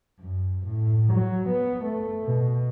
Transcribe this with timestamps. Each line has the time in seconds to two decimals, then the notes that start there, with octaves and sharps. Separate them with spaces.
0.20 F#2
0.67 A2
1.13 F#3
1.49 B3
1.85 A3
2.25 B2